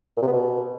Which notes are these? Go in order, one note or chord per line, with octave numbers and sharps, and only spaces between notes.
A#2
C3
B3
B2